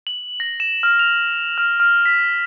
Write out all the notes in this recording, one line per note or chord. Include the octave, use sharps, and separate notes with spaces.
F#7
A#6
E7
F6
F7
F6
F6
B6